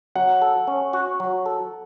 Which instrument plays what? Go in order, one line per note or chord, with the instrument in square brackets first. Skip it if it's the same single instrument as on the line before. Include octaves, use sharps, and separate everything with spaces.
[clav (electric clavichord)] F#3 [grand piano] F#5
[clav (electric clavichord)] A4
C#4
F#4
F#3
A4